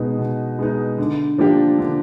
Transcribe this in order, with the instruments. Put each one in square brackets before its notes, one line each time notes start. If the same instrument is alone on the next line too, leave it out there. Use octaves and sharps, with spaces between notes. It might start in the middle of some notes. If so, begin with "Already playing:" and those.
Already playing: [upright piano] B2 G#3 B3 D#4
B2
G#3 B3 D#4
D3
F3 A#3 D4 G4
D3